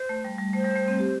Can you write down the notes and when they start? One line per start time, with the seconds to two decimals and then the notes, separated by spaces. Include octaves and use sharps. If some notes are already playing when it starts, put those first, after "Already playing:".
Already playing: C5
0.09 A3
0.25 G3
0.38 G3
0.53 A3 C5
0.64 G3
0.76 A3
0.88 C4
0.99 G4